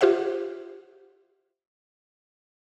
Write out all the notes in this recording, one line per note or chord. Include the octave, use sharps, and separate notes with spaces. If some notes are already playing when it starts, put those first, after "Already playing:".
F4 G4 C5 E5 F#5